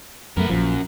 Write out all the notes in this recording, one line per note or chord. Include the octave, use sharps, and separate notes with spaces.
F#2 A3 B3 A#4
A#1 F#2 F3